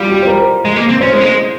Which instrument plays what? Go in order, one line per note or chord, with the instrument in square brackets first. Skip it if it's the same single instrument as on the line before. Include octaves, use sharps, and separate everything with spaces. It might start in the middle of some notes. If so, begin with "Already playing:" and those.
Already playing: [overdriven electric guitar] G3 [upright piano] F4
[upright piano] G4
C5
A#4
[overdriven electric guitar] G#3
A#3
C4
[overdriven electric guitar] C#4 [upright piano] C5
[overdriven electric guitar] G#3
A#3
G#3